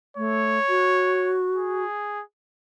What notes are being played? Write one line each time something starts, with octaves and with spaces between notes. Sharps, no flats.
A3 C#5
F#4
G#4